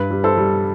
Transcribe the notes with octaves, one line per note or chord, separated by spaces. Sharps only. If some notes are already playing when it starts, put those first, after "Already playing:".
Already playing: G2 B4
G3
A4 C5
G3